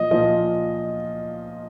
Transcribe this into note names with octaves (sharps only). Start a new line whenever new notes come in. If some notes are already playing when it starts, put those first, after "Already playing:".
Already playing: A#2 F3 D#5
A#2 F3 D#5